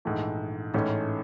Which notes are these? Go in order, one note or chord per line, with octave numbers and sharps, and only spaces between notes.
A#1 G#2 E3 A3
A1 G#2 E3 A3 C#4